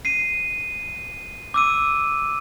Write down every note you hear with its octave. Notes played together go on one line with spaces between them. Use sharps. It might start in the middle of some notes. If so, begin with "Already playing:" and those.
C7 D#7
D6 E6 D#7